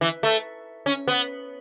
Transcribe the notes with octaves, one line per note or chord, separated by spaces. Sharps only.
E3
A3
C#4
B3